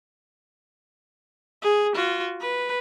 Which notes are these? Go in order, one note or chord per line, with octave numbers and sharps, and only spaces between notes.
G#4
F4 F#4
B4